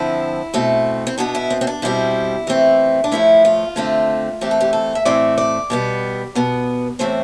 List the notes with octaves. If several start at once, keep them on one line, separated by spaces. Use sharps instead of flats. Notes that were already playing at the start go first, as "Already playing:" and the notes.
Already playing: D3 F3 C4 E4
B2 A3 C4
C4
B2 B3 D4
E4
C4
C4
D4
B2 G3 C4 E4
E3 A3 C4
D4
A2 F3 A3 E4
F4
D3 A3 C4
E3 A3 C4 G4
A4
G4
A4
E5
A2 E3 A3 C4 D5
D5
B2 G3 B3
B2 B3
A2 E3 A3 C4 C5